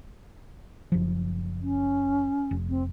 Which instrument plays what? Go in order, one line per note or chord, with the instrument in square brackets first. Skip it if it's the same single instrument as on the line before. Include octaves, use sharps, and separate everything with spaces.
[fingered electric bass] F#1 F3
[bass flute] C#4
[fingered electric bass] F1
[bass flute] C4